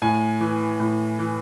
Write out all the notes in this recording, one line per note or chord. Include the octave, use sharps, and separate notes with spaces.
A2 G#5
E3
A2
E3